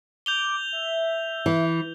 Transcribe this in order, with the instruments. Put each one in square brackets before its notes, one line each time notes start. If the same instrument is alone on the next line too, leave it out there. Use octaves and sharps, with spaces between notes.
[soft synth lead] D6 [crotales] G6 F7 G7
[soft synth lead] E5
[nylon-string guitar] E3